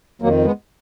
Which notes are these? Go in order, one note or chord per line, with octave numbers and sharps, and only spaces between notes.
F2 D#3 F#3 A#3
G#3 B3